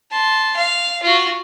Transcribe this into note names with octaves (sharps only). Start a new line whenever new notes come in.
A5 C6
F5
F4 F#4